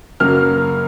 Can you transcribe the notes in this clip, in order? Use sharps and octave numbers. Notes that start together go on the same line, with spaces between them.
F#2 C#3 F#3 A#3 F6